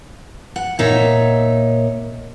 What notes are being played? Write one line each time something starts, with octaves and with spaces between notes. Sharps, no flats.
F#5
A#2 D#4 C#5 E5